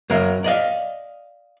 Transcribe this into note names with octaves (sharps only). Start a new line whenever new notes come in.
F#2 F#3 A#4 F5
D5 D#5 F5